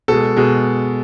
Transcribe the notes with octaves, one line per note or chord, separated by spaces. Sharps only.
B2 G#3 A4
B2 G#3